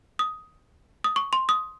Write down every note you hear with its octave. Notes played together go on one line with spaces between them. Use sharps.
D#6
D#6
C#6
C6
D#6